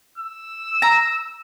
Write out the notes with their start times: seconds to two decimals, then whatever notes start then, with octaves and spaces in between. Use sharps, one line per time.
0.18 E6
0.82 A#5